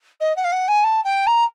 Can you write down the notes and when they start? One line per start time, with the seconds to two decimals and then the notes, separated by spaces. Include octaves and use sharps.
0.20 D#5
0.36 F#5
0.44 F5
0.52 F#5
0.68 G#5
0.84 A5
1.04 G5
1.26 A#5